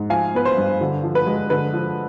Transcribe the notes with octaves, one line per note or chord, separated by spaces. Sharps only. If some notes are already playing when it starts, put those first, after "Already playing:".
Already playing: G#2
F3 F5 G#5
B3 B4
C5
G2
D3
F3
B4
G#3
D3 B4
F3